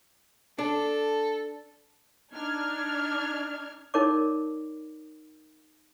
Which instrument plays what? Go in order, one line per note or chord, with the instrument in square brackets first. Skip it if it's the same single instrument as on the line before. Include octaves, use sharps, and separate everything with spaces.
[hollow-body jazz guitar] D4 [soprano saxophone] A4
[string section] D4 D#4 F6 G#6
[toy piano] D#4 A#4 C#5 D5 D6